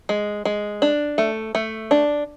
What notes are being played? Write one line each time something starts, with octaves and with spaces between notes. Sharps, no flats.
G#3
G#3
D4
A3
A3
D4